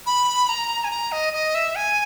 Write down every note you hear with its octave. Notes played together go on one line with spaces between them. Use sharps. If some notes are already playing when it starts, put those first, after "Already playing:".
B5
A#5
G#5
A#5
D#5
D#5
E5
G#5